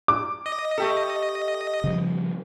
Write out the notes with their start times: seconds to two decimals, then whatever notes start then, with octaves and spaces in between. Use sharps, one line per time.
0.08 D6
0.46 D#5
0.78 A3 G4 A4
1.84 C#3 F3 G3